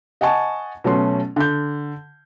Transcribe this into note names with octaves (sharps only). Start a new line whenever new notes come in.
D#5 F#5 G#5 A5 C#6
B2 F#3 A3 C#4 C6
D3 G6